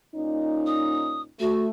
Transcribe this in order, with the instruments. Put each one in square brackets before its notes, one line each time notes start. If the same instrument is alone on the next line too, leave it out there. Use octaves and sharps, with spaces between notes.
[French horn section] A#2 C#4 D#4
[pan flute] D#6
[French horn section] A3 [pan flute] F#4